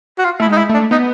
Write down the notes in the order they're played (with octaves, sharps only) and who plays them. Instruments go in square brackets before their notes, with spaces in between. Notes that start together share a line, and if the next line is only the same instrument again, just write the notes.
[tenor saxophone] F#4
F4
[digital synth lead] A3 [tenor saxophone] E4
[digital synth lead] G#3
[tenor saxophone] D#4
E4
[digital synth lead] A3 [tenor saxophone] D4
[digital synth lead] B3 [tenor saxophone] D#4